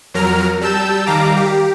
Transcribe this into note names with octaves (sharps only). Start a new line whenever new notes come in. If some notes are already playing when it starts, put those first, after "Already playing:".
F2 F#3 A#4 A#5 F6
G3 A5 E6 G6 E7
D#3 G3 F5 A#5 D6
G4